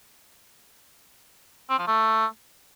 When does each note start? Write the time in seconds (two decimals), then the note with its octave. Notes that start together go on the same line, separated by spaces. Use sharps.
1.70 C4
1.79 F3
1.87 A3